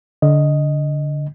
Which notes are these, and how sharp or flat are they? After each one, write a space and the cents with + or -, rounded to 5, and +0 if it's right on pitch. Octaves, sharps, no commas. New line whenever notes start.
D3 -15 D#5 +0